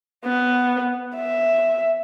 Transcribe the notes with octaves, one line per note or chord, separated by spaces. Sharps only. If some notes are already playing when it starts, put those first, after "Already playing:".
B3
E5